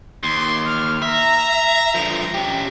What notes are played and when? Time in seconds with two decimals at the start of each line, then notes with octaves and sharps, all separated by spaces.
0.23 D#2 C6
0.66 F6
1.02 E5 A#5
1.94 D3 F3
2.34 C#4 G4